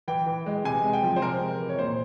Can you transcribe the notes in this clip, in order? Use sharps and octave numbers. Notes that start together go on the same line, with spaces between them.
E3 G5
E3
G#3
C3 G#5
G#3
G5
F3
C5
C3 A#4
G#3
E3
C#5
A#2 C5